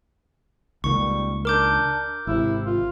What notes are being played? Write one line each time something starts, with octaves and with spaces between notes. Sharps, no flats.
C#2 D#3 G3 A#3 C#6
D4 A#4 D6 G6
G#1 C3 E4
F4